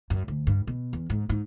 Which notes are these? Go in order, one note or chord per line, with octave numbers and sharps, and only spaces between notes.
F#2
D2
G2
B2
E2
G#2
G#2